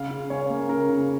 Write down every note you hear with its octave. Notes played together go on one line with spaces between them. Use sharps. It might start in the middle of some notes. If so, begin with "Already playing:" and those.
Already playing: C#3 F5
C#3
C#4 C#5
A#3
C#3 A#4
C#3